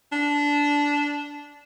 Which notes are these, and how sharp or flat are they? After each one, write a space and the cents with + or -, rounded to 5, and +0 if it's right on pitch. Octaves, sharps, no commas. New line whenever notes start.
D4 -15